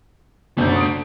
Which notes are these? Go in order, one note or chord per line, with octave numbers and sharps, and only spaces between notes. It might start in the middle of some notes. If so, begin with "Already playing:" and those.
F#1 F#2 A3 D4 G6
D#6 D7